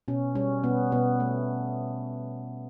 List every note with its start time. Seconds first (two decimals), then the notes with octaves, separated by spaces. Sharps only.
0.08 B2 C#4
0.35 G3 C#4
0.63 B2 B3
0.92 B2 B3
1.20 A3